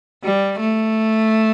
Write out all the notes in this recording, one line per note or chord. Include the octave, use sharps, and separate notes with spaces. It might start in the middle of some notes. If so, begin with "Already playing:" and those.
G3
A3